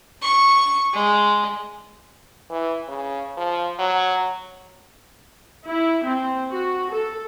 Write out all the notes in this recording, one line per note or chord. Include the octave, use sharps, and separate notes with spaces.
C#6
G#3
E3
C#3
F3
F#3
E4
C4
F#4
A4